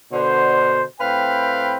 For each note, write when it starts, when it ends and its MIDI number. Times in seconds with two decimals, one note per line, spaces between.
0.12 0.82 47
0.12 0.82 50
0.12 0.82 72
1.00 1.78 45
1.00 1.78 60
1.00 1.78 71
1.00 1.78 77
1.00 1.78 79
1.00 1.78 83